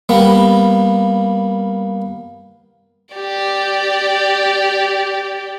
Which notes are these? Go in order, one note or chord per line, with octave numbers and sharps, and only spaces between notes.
G3 A#3 B3
G4 D5